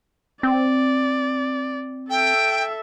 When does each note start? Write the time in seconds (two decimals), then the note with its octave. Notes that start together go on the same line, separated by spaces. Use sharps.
0.43 C4 D5
2.10 A4 E5 G5